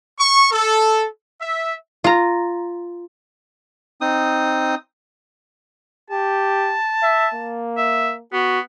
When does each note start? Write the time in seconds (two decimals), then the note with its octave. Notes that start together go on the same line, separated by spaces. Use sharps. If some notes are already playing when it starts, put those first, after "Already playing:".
0.19 C#6
0.52 A4
1.41 E5
2.04 F4 A#5
4.01 C4 D#4 D#6
6.10 G4 A5
7.03 E5
7.34 A#3
7.78 E5
8.33 B3 F#4